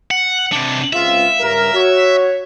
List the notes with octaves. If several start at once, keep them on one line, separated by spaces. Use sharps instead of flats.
F#5
C3 D4
C#2 C4 F4 E5
G2 C#3 A#4
F#4 C#5